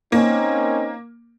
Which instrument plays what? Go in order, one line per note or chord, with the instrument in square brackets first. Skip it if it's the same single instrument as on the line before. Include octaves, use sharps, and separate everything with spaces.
[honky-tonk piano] A#3 [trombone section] C4 C#4 D#4